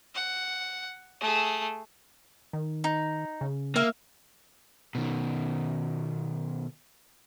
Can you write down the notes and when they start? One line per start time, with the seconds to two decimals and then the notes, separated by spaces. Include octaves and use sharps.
0.15 F#5
1.21 A3 G#4
2.53 D#3
2.84 D#4
3.41 C#3
3.76 A#3 E5 F5
4.95 B2 D#3